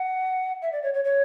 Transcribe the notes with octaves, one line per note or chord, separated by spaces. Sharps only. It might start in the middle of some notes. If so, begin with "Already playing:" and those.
Already playing: F#5
E5
D5
C#5
C#5
C#5